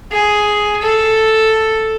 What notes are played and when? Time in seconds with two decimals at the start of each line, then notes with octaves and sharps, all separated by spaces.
0.12 G#4
0.82 A4